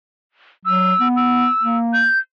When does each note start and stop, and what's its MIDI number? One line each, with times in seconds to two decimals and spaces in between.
0.66 0.94 54
0.66 1.08 88
1.00 1.47 59
1.16 1.77 88
1.63 2.06 58
1.93 2.19 91